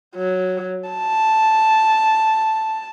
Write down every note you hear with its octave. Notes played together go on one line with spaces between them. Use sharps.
F#3
A5